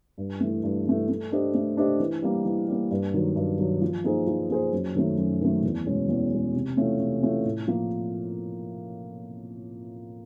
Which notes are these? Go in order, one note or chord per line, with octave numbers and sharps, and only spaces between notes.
G2
E3 A3
G2
E3 A3
A3
D4 G4 C5 D#5
A3
D4 G4 C5 D#5
E3
G3 A#3
E3
G3 A#3
G2
D#3 F#3
G2
D#3 F#3
F3
A#3 D#4 G#4 C5
F3
A#3 D#4 G#4 C5
F#2
D#3 F#3 A3
F#2
D#3 F#3 A3
E2
B2 G#3 C#4
E2
B2 G#3 C#4
C3
E3 A3 C#4 F4
C3
E3 A3 C#4 F4
A2
F3 A#3